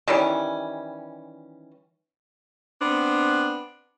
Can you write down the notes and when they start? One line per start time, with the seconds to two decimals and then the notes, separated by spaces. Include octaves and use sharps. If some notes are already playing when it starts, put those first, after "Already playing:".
0.08 D#3 E3 G3 C#4
2.81 B3 C4 D4